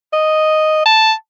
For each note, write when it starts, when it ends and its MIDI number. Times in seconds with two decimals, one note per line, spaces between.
0.13 0.85 75
0.86 1.13 81